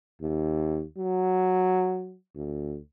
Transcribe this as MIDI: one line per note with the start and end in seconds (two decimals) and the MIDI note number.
0.22 0.83 39
0.98 2.16 54
2.36 2.77 38